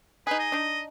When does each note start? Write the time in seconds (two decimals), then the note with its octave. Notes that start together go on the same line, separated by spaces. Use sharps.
0.27 D#4 G#4 B4
0.39 D#5
0.52 D4 D#4